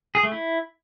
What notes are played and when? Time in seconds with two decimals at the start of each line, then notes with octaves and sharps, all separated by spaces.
0.15 G#4
0.23 A3
0.32 E4